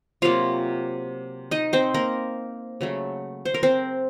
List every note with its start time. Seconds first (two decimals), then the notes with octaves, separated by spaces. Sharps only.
0.22 C3 F#3 A#3 F4 F5
1.51 D#4 D#5
1.73 C4 C5
1.94 A#3 A#4
2.81 C#3 F#3 A3
3.45 C5
3.54 A#4
3.63 C4 C5